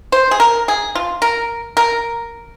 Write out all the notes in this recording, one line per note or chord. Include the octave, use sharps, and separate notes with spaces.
C5
G#4
A#4
G#4
F4
A#4
A#4